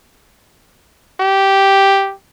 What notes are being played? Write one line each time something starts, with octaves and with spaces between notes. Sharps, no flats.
G4